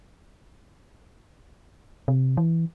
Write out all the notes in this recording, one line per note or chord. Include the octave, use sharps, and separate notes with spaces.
C3
E3